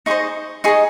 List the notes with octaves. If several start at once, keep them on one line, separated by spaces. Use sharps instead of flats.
D#4 G#4 C5 D#5 C#6
D#4 G#4 D#5 C#6